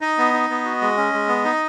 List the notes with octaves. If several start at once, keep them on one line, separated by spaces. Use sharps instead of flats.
D#4 D#5
B3
D#4
B3
F#4
G#3
C#4
G#3
B3
D#4